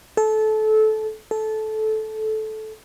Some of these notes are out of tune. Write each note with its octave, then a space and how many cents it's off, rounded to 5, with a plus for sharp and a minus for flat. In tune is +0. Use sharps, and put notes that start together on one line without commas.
A4 -20
A4 -15